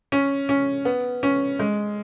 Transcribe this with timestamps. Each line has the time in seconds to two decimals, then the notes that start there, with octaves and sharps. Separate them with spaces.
0.12 C#4
0.49 C#4
0.85 B3
1.23 C#4
1.59 G#3